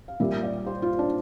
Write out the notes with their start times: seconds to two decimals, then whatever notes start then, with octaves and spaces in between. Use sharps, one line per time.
0.08 F5
0.20 A#2 G3 A#3 E5
0.43 D5
0.66 C5
0.82 F4
0.99 D4